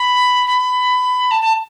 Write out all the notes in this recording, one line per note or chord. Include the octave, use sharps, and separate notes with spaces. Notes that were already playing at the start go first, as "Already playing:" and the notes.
Already playing: B5
B5
A5
A5